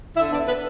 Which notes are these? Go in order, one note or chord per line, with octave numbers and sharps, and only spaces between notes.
D3 E4 E5
B3 D4 D5
B3 B4